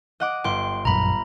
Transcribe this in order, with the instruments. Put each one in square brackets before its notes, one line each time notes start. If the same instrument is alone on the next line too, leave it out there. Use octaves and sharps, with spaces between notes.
[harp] D#5 F#5 D6
[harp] G1 [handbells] G5 C6
[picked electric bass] A#1 F#2 [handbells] A#5 B5